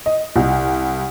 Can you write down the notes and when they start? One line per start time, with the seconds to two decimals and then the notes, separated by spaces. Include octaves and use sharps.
0.06 D#5
0.36 C2